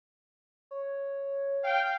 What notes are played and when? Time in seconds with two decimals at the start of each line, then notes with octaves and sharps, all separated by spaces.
0.71 C#5
1.63 F5 G5